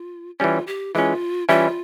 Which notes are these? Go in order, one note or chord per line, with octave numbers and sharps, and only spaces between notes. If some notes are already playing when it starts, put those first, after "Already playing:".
Already playing: F4
E3 G3 C#4 F4
G4
E3 G#3 C#4 F4
E3 G3 C#4 E4 F4